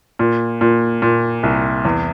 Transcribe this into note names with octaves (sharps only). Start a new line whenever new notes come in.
A#2
A#2
A#2
C2
E2